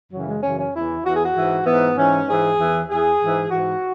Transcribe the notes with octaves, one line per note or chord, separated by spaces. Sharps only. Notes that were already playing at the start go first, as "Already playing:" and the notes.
F#2 C#3 E3 F#3
G#3
F#2 C#3 E3 C#4
C#4
E2 E3 E4
E2 E3 F#4
G#4
F#4
G#2 E3
G#2 E3 B3
G#2 E3 C#4
G#2 E3 G#4
E2 E3
E2 E3 G#4
G#2 E3
G#2 E3 F#4